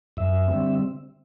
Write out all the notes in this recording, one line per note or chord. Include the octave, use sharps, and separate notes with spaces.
F#2 E5
D3 G3 C4